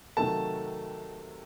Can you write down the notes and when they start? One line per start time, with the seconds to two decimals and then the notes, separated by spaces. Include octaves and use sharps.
0.17 C3 D#3 F#3 A3 A5